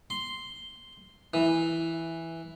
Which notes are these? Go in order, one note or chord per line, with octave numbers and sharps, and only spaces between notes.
C6
E3